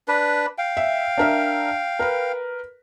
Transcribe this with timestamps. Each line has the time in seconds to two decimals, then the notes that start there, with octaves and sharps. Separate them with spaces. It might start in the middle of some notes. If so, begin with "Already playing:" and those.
0.08 D4 B4
0.58 F5 G5
0.77 E5
1.18 D4 A#4 E5
1.99 A#4 B4